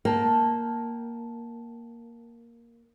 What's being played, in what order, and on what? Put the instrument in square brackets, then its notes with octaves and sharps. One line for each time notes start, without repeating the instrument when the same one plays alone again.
[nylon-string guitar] A#3 [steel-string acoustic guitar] G5 A5